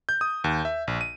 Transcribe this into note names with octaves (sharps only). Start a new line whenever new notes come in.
G6
D#6
D#2
E5
A#1
D#7